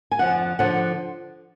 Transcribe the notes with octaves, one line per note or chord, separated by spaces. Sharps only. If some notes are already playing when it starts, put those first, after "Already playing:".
G#5
F2 D3 F3 F#5
D3 F3 F#5